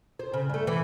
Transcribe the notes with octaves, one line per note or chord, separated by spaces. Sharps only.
C5
C#3
G2 A3
E3